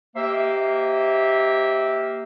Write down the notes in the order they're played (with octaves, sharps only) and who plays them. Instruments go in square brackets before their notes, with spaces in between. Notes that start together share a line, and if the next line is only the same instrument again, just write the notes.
[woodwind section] A#3 G4 C5 D#5 E5